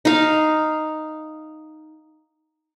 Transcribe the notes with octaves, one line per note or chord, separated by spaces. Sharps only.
D#4 F5